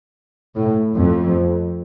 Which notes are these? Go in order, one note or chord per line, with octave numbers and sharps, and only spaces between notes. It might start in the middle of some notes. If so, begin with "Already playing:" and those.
A2
F2